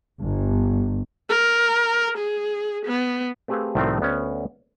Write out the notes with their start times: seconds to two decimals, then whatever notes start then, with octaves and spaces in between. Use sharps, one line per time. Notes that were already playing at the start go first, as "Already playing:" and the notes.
0.22 G1
1.30 A#4
2.18 G#4
2.86 B3
3.48 A3 C4 G4 G#4 B4 F5
3.75 C2 A2 D#3 F3 A3 C4
4.01 D2 B3 C#4